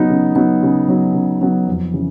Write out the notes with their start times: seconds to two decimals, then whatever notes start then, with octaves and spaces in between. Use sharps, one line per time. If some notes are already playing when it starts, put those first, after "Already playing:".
Already playing: C#3 F#3 B3 D#4
0.10 C#3
0.36 F#3 B3 D#4
0.63 C#3
0.88 F#3 B3 D#4
1.14 C#3
1.41 F#3 B3 D#4
1.67 F2
1.94 C#3 E3